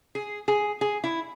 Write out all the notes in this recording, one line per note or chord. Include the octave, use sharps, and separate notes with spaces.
G#4
G#4
G#4
E4